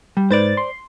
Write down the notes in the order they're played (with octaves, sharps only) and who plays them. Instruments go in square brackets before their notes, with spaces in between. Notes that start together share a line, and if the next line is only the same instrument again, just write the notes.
[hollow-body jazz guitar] G3
[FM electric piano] G#2 B4 A6 [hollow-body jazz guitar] C5 D5
[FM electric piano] C6